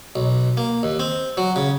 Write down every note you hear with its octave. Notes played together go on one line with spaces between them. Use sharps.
B1
A#3
D#2
C4
F#3
C#3